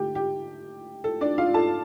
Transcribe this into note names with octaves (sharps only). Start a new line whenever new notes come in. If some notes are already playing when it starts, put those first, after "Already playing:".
Already playing: D3 A3 G4
G4
A4
D4 D5
F4 F5
A4 A5